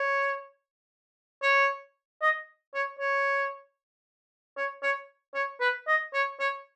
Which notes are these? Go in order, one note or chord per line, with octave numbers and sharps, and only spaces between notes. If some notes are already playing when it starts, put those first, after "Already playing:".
Already playing: C#5
C#5
D#5
C#5
C#5
C#5
C#5
C#5
B4
D#5
C#5
C#5